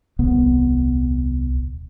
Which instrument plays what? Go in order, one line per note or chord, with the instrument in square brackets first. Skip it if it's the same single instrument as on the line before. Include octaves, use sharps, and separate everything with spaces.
[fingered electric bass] D#1 C2 B3